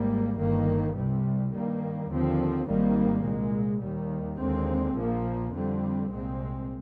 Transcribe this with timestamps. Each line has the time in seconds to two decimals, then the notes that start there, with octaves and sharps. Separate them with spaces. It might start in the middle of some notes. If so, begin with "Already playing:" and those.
Already playing: G#1 G#2 G3 A#3
0.37 G1 G2 D#3 A#3
0.94 C2 C3 G3
1.53 G2 D#3 G3 A#3
2.10 D#2 D3 F3 C4
2.66 G#1 G#2 D#3 G3 A#3
3.24 C2 A#2 G#3
3.80 D#2 D#3 G3
4.38 D#2 D3 G#3 C4
4.96 A#1 A#2 F3 A#3
5.53 F2 D3 G3 C4
6.11 C2 A#2 G#3 C4